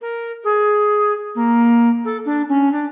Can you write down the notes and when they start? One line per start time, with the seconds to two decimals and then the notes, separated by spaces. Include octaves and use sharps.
0.01 A#4
0.44 G#4
1.35 A#3
2.04 A4
2.25 D4
2.48 C#4
2.72 D4